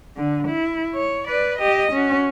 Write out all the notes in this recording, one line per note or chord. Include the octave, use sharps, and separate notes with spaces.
D3
E4
C#5
B4 D5
G4 D#5
C#4 F#4